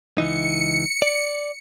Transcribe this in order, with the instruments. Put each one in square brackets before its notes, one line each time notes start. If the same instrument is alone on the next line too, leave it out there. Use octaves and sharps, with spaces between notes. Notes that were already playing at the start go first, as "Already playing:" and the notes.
[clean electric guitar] C#2 E3 D#4 [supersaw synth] C#7
[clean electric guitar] D5